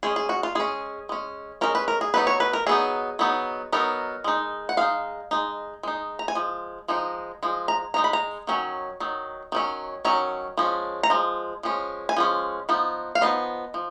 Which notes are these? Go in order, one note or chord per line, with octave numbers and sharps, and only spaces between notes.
G#3 C#4 G#4
G#4
F#4
F4
G#3 C#4 G#4
G#3 C#4
G#3 C#4 A#4
B4
A#4
G#4
F#3 B3 D#4 B4
C#5
B4
A#4
F#3 B3 D#4 G#4
F#3 B3 D#4
F#3 B3 D#4 A#4
G#3 D#4
F#5
G#3 D#4 F5
G#3 D#4
G#3 D#4
A#5
G#5
F3 G#3
F3 G#3 D#4
F3 G#3
A#5
F3 G#3 D#4 A#5
B5
A#5
D#3 F#3 C#4
D#3 F#3
D#3 F#3 C#4
D#3 F#3 C#4 A#5
F3 G#3 C#4
A#5
F3 G#3
F3 G#3 C#4
G#5
F3 G#3 C#4
F3 B3 D#4
F5
F3 B3 D#4 D#5
F3